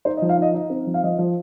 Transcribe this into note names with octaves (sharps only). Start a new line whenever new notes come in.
D#4 C5
D#5
F3
F5
D#4 D#5
D#4 D#5
C4
F3
F5
F3 D#5
F3